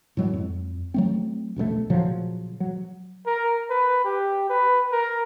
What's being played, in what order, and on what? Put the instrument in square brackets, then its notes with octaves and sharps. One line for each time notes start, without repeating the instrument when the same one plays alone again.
[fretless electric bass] A2 F#3 G#3
F2
F#3 A3 C4
E1 A#1 G#2 A3
A#2 C#3 F3 F#3
F#3
[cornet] A#4
B4
G4
B4
A#4